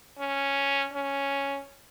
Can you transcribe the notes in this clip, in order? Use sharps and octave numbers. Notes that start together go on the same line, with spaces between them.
C#4
C#4